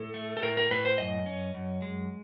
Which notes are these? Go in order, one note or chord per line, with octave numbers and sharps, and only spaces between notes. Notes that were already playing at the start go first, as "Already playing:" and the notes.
Already playing: A2 A4
A3
A4
A2 A#4
A#4
A2 B4
C5
F#2 D#5
C#4
F#2
G#3